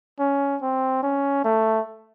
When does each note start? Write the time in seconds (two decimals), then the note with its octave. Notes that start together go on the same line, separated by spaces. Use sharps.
0.19 C#4
0.62 C4
1.03 C#4
1.45 A3